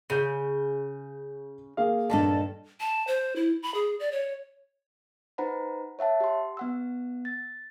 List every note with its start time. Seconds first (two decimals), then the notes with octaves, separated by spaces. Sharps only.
0.10 C#3 G6 D#7
1.77 A#3 G#4 F5
2.10 G2 A#2 D#3 A4 A5
2.80 A5
3.07 C5
3.36 E4
3.62 B5
3.74 G#4
4.00 D5
4.12 C#5
5.38 D#4 B4 C5 F#5 A#5 B5
5.99 C#5 E5 F#5 A5
6.20 G4 C6
6.57 B3 F#5 E6
7.25 A6